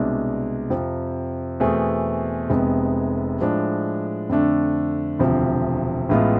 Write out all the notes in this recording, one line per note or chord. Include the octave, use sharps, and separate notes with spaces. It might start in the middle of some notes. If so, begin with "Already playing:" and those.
Already playing: C2 B2 G#3 D4
F2 C3 F3
E2 B2 A3 C4 G#4
F1 F2 C3 G#3 B3
A2 F3 G#3 D4
F2 D3 A3 D4
E1 D2 C3 F3
A1 A2 G#3 B3 F4